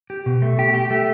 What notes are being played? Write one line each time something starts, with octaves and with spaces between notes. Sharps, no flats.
G4
B2
A3
G4
G4
A3